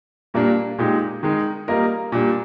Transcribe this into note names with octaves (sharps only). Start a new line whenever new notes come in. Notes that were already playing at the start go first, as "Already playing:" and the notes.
A#2 G3 A#3 D4
A#2 G#3 D#4 G4
D#3 G#3 D#4
G3 A#3 F4 A#4 D#5
A#2 G3 D4